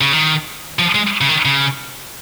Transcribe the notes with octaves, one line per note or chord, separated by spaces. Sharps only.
C#3
D#3
F3
G#3
C#3
D#3
C#3